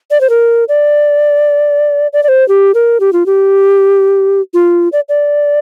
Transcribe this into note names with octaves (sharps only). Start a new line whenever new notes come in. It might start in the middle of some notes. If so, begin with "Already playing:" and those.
D5
C5
A#4
D5
D5
D5
C5
G4
A#4
G4
F4
G4
F4
D5
D5